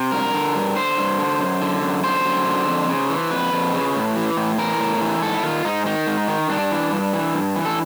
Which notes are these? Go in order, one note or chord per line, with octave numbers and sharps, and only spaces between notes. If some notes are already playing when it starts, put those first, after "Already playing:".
Already playing: C3
G2 A#4
D3
G2
D3 C5
G2
D3
F#2
D3
F#2
D3 C5
F#2
D3
F2
C#3
E3
F2 B4
F2
C#3
A2
E3
A2
E3 A#4
A2
E3
G#2 A4
E4
D#3 F4
G#2 D#4
D#3 D#4
G#2
D#3
G2 D4
E3
G2
E3
G2
E3
A4